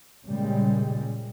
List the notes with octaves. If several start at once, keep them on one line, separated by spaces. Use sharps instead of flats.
A#2 C#3 G3 G#3